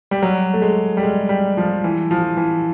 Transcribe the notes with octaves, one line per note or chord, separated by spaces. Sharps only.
G3
F#3
A3
G#3
G3
G#3
G3
F3
E3
F3
E3